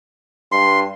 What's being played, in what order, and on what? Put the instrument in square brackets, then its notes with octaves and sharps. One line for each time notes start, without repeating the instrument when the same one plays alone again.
[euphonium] G2 [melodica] C6